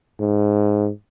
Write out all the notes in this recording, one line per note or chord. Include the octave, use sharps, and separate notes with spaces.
G#2